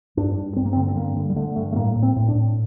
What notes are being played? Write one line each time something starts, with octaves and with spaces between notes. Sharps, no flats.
G2 D4
G2
G2 C4
A#3
C4
D3
C4
G2 A#3
D3
G3
D3 A3
G2 A3
A3
A2 A#3
A2
C4
A2
D4
A2